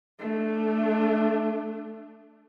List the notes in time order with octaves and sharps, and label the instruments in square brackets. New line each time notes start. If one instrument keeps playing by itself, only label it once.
[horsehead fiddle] A3 D4